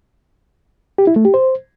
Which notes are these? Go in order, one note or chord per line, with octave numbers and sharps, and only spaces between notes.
G4
E4
A3
G4
C5